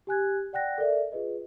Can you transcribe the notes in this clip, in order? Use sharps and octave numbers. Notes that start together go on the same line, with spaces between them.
G4 G#5 F#6 G#6
D5 F#5 G5 F#6 A#6
A4 A#4 D5 E5
F4 G#4 B4 D#5